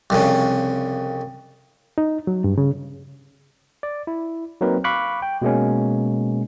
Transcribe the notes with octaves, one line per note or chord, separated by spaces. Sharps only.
C2 F2 C#3
D#4
F#3
G2
C#3
D5
E4
F#3 A#3 C4 D#4 A#4 B4
F5 B5 C#6 D6 F#6
G5
B2 G#3 A#3 C#4